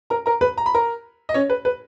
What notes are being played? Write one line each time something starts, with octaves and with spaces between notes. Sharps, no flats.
A#4 A#5
A#4 A#5
B4 B5
A#5
B5
A#4 A#5
D#5
C#4 C#5
B4
B4